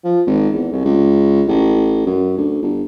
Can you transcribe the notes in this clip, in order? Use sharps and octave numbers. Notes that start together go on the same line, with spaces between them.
F3
G#1
E2
C2
C#2
A1
F#2
D2
G1